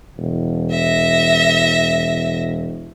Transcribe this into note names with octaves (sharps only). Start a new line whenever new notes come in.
E1
E5 A#6